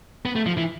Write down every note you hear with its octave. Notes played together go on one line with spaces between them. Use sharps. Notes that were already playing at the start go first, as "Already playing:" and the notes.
B3
A3
F3
E3